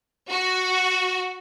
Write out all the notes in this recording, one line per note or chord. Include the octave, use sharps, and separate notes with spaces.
F#4